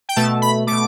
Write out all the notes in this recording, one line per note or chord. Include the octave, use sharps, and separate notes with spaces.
G5
B2 A3 A5
B5
B2 A3 D6